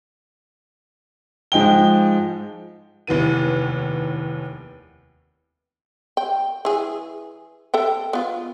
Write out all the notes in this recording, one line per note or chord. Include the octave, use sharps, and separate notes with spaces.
G#2 F3 G#3 G5 G7
F1 D#2 E3 B3 D#7
G5
E3 G#4
A4 E5 G5
B3 F4